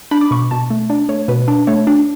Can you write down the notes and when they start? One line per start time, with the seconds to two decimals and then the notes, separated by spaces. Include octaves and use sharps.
0.11 D4 B5
0.21 D6
0.31 B2 C#6
0.51 B2 A5
0.70 A3
0.90 D4 D5
1.09 A3 C#5
1.28 B2 B4
1.48 D4
1.67 A3 C#5
1.87 D4